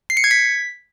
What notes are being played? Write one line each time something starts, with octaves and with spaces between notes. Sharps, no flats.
C7
C#7
G#6
B6